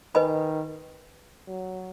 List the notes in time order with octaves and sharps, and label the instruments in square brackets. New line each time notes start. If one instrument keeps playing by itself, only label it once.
[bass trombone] D#3 [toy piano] B4 D#5 G#5 B5
[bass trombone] F#3